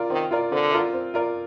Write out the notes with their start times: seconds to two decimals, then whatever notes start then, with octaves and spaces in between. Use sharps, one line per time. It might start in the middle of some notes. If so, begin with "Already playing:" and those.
Already playing: F4 A#4 D5
0.10 D#3 C4
0.31 F4 A#4 D5
0.51 D3 C4
0.72 F4 A#4 D5
0.93 C4
1.14 F4 A#4 D5